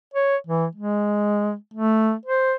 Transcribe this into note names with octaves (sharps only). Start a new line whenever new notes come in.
C#5
E3
G#3
A3
C5